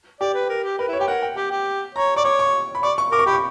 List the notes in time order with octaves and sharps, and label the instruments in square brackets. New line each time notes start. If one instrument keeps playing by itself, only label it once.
[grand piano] G4 [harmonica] D5
[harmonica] B4
A#4
G4
[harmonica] A#4 [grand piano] B4
[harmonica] E4
[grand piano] C#5
[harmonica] G4 [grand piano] G5
[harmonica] A#4 [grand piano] F#5
[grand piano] G5
[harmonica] G4 [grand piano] G5
[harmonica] G4
[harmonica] C#5 [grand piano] A#5
[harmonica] D5 [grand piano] C#6
[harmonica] C#5 [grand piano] D6
[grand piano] C#6
B5
[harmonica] D5 [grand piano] C#6
[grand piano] C#6
[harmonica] A#4 [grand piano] D6
[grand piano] C#6
[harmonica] G4 [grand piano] B5
[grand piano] C#6